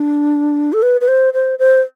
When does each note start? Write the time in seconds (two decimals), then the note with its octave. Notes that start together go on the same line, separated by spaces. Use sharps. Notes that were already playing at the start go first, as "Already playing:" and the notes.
Already playing: D4
0.73 A4
0.82 B4
1.01 B4
1.08 C5
1.34 C5
1.59 C5